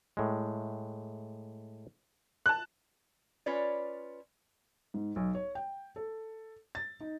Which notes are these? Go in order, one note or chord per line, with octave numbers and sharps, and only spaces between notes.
A2 G#3
A5 F#6
C#4 F4 B4 C#5 D5
G#2
B1
C#5
G5
A4
A6
D#4